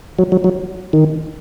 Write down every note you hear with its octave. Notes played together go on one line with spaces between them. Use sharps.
F#3
F#3
F#3
D#3